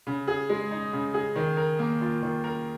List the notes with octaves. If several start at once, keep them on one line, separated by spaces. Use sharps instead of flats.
C#3
G#4
G#3
D#4
C#3
G#4
D#3
A#4
A#3
F4
D#3
A#4